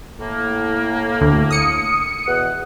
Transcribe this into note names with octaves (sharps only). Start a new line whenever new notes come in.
A2 A#3
D2
D#6 C#7
E2 B2 F#5